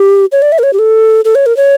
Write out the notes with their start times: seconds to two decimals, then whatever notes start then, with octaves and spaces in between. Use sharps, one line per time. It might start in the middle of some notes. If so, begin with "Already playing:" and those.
Already playing: G4
0.32 C#5
0.42 D5
0.52 E5
0.59 A#4
0.63 C#5
0.73 G4
0.79 A4
1.25 A4
1.35 C#5
1.46 A#4
1.57 C#5